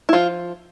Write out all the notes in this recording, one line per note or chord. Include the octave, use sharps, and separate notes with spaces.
E4
F3 F4